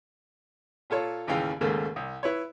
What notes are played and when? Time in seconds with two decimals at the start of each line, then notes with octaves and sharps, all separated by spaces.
0.90 A#2 F4 A4 C#5
1.27 A1 D#2 C#3 E3 F5 G5
1.61 D#2 G#2 C#3 A3 A#3
1.96 C2
2.23 E4 B4 C#5